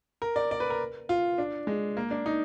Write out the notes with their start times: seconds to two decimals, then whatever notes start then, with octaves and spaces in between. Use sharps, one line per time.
0.22 A#4
0.36 D5
0.51 D5
0.60 B4
0.70 A#4
1.09 F4
1.38 D4
1.67 G#3
1.97 A#3
2.11 D4
2.26 D#4